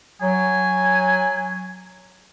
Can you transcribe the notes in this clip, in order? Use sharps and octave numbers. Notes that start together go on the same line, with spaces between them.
F#3 G#5